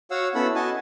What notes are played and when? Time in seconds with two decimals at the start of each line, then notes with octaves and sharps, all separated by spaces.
0.11 F#4 C#5 F5 F#5 E6
0.35 B3 C#4 E4 A4 B5 E6
0.55 F#4 D#5 G#5 A5